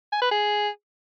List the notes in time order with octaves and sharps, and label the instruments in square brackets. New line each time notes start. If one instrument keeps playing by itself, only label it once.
[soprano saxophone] G#5
B4
G#4